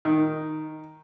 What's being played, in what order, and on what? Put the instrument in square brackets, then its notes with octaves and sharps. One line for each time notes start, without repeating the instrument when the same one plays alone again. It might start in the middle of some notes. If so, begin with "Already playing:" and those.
[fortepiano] D#3